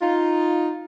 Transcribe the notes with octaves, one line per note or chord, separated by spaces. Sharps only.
D#4 F4